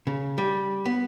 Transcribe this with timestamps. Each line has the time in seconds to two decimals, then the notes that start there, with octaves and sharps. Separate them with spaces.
0.07 C#3
0.38 G3
0.85 B3